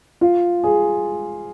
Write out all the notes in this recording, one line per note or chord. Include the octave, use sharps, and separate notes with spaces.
F4
G#4